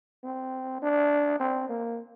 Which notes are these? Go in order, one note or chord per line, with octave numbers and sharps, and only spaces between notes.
C4
D4
C4
A#3